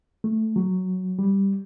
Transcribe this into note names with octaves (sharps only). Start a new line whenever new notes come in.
A3
F#3
G3